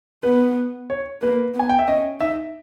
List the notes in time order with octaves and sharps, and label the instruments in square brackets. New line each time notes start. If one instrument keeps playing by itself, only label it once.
[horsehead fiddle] B3 [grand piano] B4
[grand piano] C#5
[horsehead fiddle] A#3 [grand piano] B4
[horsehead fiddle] B3
[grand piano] G#5
G5
E5
[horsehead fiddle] C#4 [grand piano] D#5
[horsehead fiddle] D#4 [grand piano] E5